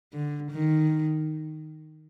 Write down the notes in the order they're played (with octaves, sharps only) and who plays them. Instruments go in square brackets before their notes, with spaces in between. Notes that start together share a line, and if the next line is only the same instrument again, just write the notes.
[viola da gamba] D3
D#3